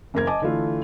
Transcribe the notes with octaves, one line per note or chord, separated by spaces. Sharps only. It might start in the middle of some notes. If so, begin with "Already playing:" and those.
F#1 A#3 A#4 G#6
D#5 G#5 A5 D6
D3 E3 A3 F4